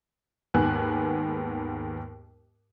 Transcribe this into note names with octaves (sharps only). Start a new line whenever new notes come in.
D#2 G#2 B3 G#5 F#6